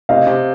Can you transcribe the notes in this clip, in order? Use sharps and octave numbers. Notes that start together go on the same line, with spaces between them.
C3 D#5 F5
C3